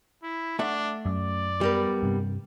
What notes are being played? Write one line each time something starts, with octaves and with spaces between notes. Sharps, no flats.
E4
A3 D4 E5 F#5
F#2 D5
G3 B3 A#4 B4
G2 C3